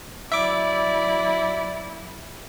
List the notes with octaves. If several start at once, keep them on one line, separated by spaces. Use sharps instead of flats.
F#3 E4 D5 E5 D6